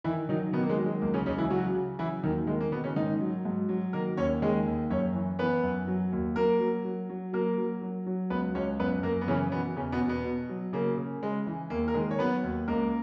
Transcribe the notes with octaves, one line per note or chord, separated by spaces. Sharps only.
D#3 E3 E4
D#3 F#3 D#4
B2 D#3 B3
A#3
G#3
F#3
G#3
C#2 A#3
C#3 C#4
C#2 C#3 C#4
E3 E4
C#3 F#3 F#4
C#3
E3 F#3 E4
D#2 D#3 D#4
D#3 G#3
A#3
B2 D#3 B3
C#3 C#4
G#2 D#3 D#4
F#3
G#2
F#3
D#3 A#3 A#4
D#2 C#4 C#5
D#3 G#3 G#4
D#2
F#2 C#4 C#5
E3
E3 B3 B4
F#2
F#3
D#2
F#3 A#3 A#4
F#3
F#3
F#3
F#3 A#3 A#4
F#3
F#3
F#3
C#2 B3 B4
C#2 C#4 C#5
F#2 B3 B4
F#2 A#3 A#4
B3
C#3 E3 C#4
B2 E3 B3
E2 C#3 C#4
B2 B3
E2
B2 B3
B2
F#3
C#3 A#3
C#3
C#3 G#3
E3
D#2 A#3
A#4
D#3 G#3 G#4
C#5
F#3 B3 B4
D#2
C#2 A#3 A#4